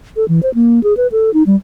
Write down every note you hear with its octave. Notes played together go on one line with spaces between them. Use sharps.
A4
E3
C5
A#3
G#4
B4
A4
D#4
G3